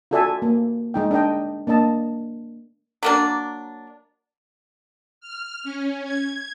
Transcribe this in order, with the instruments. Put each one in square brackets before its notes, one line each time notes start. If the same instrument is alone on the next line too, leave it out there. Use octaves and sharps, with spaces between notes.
[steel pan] F4 F#4 A4 D5 E5 G#5
A#3
G#3 D#4 G5
D4 A#4 D#5 G5
A#3 D4 D#5 A5
[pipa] F#3 A#3 D4
[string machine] F6
C#4
G#6